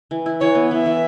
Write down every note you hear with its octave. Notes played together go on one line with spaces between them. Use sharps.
E3
E4
E3 C#5
B3
E3 E5
E3